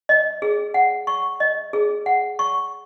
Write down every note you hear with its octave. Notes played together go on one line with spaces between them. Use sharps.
D#5
G#4
F#5
C#6
D#5
G#4
F#5
C#6